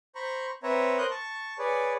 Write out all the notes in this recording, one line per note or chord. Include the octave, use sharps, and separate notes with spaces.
C5 A#5 B5 C#6
C4 B4 C#5 E5 A#5
A#4 C5 D#6 F#6 G6
A5 C#6
G#4 B4 C#5 D5